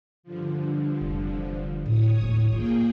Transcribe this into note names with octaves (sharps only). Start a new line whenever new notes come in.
G2 D3 F3
F1
A2 C#5 D#6
D#2 A2
A#3 F4 G#4 G5